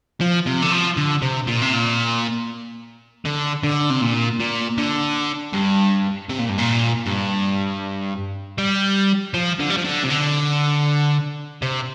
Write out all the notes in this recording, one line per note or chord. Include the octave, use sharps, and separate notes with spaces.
F3
C3
D3
F3
D3
C3
A#2
C3
A#2
D3
D3
C3
A#2
A#2
D3
G2
C3
A#2
G2
A#2
G2
G3
F3
D3
G3
F3
D3
C3
D3
C3